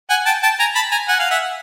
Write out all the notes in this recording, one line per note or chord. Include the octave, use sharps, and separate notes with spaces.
F#5 G#5
G5 A5
G5 A5
G#5 A#5
A5 B5
G#5 A#5
F#5 G#5
F5
E5 F#5